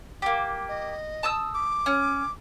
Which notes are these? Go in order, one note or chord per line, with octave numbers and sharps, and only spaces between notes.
A#3 G4
D#5
A5 D#6 E6
D6
C#4